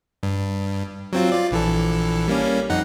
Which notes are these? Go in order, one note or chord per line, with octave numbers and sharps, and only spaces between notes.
G2
F#3 C4 F4
F4 D5
A#1 E3 A4
G3 A#3 C#4
F2 D#4 F#5